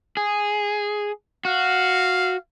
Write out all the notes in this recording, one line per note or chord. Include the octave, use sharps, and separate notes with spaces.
G#4
F#4 F5